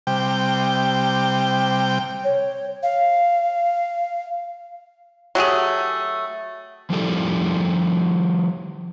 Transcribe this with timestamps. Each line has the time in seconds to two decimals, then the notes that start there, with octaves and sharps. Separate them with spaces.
0.07 C3 G3 G5
2.24 C#5
2.83 F5
5.35 F#3 A3 G4 G#4
6.90 F3 G3 E4 G4 A4 D5